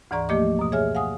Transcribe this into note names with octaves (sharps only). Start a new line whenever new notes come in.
D2 G#2 E3 D5 A#5 C#6
F3 A3 A#3 G4 D#5 D6
F#2 B2
G#4 C#5 E5 G#5 F6
F5 F#5 G#5 D#6